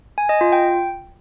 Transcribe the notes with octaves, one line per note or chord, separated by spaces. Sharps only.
G#5
D#5
F4
G5